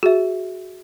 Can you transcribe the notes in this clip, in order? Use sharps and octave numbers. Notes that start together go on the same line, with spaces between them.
F#4 G#4 E5